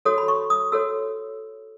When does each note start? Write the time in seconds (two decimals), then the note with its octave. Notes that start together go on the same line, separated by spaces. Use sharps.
0.05 F#4 A4 C#5 D#6
0.18 B5
0.28 C#6
0.50 D#6
0.72 F#4 A4 C#5 E6